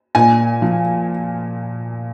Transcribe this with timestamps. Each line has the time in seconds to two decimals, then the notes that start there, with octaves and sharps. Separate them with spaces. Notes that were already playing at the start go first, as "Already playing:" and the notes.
0.15 A#2 G#5
0.62 F3